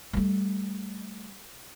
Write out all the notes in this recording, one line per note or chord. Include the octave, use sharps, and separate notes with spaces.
G3 A3